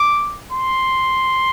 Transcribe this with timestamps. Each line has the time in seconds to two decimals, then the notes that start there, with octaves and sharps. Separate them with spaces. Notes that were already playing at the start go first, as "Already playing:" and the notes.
Already playing: D6
0.52 C6